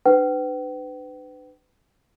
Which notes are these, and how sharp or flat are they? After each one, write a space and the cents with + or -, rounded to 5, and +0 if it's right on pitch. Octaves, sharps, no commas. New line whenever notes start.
D4 +35 B4 +35 G5 -40